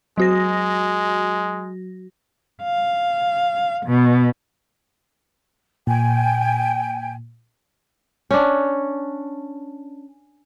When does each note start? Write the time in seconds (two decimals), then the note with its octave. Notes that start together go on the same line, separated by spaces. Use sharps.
0.18 F#3 G#3 F#4 A#6
2.62 F5
3.86 B2
5.87 A#2 G5 G#5
8.31 C#4 D4